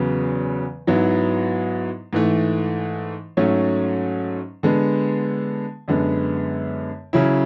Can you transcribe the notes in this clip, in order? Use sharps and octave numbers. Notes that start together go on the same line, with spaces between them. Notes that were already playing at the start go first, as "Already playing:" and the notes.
Already playing: E2 C#3 F#3 B3
G#2 F#3 B3 E4
G#2 E3 A3
G#2 F#3 A3 C#4
D3 G#3 B3
F#2 D3 G#3 B3
C#3 F#3 C#4 E4